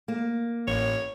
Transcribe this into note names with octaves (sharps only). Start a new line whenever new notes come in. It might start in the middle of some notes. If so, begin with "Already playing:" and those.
A#3
A1 C#5